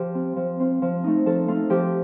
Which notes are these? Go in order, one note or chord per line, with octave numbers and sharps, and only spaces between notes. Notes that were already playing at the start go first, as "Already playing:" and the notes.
Already playing: F3 G4
C4 F4
F3
C4 F4
F3
A3 D#4
F3 A4
A3 D#4 F4
F3 G4